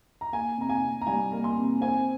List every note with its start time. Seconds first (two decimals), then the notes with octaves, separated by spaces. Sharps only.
0.21 A#5
0.32 A#3 G#5
0.58 C3 A#5
0.69 G#5
0.82 C3
1.01 A#5
1.07 G3 G#5
1.32 A#3
1.44 C6
1.56 C3
1.81 C4 G#5